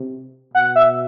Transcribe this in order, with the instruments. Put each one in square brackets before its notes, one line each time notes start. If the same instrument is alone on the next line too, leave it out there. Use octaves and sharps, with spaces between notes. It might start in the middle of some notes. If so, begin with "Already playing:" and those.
Already playing: [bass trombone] C3
[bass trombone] B2 [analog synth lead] F#5
[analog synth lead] E5